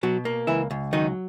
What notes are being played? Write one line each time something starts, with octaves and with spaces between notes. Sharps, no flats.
B2 F#3 F#4
A#3
C#2 E3 E4
C#2
D#3 F#3 D#4